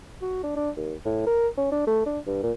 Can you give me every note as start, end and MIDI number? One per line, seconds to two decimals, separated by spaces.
0.21 0.39 66
0.43 0.51 62
0.56 0.70 62
0.77 0.94 39
1.05 1.24 45
1.26 1.48 70
1.57 1.69 61
1.71 1.83 62
1.87 2.02 57
2.06 2.19 62
2.27 2.38 43
2.43 2.52 46